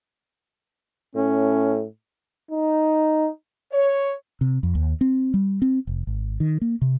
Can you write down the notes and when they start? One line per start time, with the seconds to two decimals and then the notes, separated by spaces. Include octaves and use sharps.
1.15 A2 C#4
2.51 D#4
3.72 C#5
4.41 C3
4.63 F2
4.75 D#2
5.01 C4
5.34 G3
5.62 C4
5.87 F1
6.07 G#1
6.40 D#3
6.61 A#3
6.82 C3